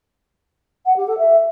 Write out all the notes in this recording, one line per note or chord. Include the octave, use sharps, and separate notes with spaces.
F#5
G4
A4
E5